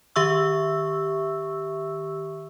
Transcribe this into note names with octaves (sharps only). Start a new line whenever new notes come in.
D#3 G4 E5 C#6 E6